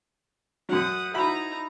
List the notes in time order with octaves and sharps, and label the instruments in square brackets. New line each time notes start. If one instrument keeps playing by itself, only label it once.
[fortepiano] F#2 F#3 [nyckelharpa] F#5 D#6
[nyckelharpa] D#4 A#5 [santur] E4 C5 [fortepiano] F#4 B5